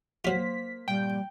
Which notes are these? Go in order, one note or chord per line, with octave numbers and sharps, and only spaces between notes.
F#3 A#3 F4 C5 B6
G2 A#2 G3 G5